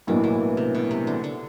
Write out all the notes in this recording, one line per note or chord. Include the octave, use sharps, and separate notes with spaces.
B1 A2 E3 F#3 A#3 D4
E3
C3
B2
C3
D3
D3